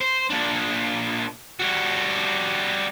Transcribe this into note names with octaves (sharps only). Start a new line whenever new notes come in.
C5
A#2 D4
G3 F#4